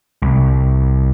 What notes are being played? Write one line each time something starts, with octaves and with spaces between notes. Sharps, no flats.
C2